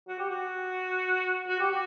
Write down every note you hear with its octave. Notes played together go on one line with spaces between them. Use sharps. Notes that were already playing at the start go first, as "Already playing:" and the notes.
F#4
G4
F#4
F#4
G4
F#4